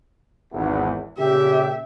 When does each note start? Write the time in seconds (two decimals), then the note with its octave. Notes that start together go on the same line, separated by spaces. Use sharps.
0.53 G#1 E2
1.18 A#2 C#3 G4 E5